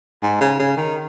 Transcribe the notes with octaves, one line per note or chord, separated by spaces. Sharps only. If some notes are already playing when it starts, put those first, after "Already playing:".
G#2
C#3
C#3
D#3